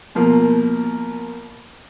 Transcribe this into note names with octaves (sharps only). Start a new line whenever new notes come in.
B2 F3 A#3